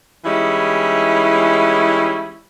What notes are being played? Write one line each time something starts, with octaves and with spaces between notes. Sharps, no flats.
E3 G3 G#3 C#4 D#4 E4